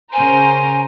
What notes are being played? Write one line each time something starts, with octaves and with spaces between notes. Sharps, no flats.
C#3 A#4 C5 G#5